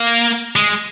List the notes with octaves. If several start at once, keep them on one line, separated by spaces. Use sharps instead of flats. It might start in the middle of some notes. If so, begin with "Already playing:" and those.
Already playing: A#3
G#3